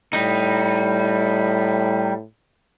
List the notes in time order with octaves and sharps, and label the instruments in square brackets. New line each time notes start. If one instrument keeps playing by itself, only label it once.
[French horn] A2 [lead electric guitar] G3 D#4